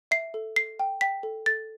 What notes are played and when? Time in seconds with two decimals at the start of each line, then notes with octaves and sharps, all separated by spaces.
0.11 E5 C7
0.34 A4
0.56 A4 C7
0.79 G5
1.01 G5 B6
1.23 A4
1.46 A4 A6